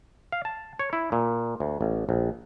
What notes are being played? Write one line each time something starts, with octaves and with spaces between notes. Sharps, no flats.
F5
A5
C#5
E4
A#2
D2
A1
A#1